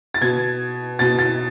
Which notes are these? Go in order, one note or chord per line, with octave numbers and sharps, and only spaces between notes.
A6
B2 G#6
B2 A6
A6